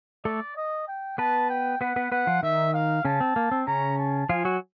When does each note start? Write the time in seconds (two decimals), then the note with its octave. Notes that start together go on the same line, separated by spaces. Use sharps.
0.25 A3 A4 D5
0.56 D#5
0.88 G5
1.18 B3 B4 A5
1.49 G5
1.81 B3 B4 F#5
1.96 B3 B4
2.11 B3 B4 F#5
2.27 F3 F4
2.43 D#3 D#4 E5
2.74 F5
3.05 C#3 C#4 A5
3.21 C4
3.36 A#3
3.51 C4
3.67 C#3 C#4 A#5
3.98 A5
4.29 F3 F4 G#5
4.45 F#3 F#4